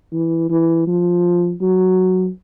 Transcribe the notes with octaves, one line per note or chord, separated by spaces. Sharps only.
E3
E3
F3
F#3